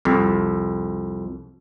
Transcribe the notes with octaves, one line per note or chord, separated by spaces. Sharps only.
C2 F2